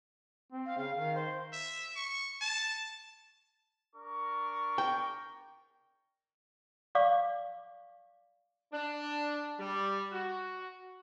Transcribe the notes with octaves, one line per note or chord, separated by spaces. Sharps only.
C4
F5
C#3 F5
D#3 F5
C5
E5
C#6
A5
D4 A#4 C#6
G5
D5 F5 C#6 D6
D4
G3
F#4